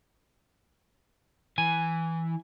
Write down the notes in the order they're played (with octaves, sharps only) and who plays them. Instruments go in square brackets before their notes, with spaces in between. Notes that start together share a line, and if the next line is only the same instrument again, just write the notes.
[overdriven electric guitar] E3 [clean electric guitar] G#5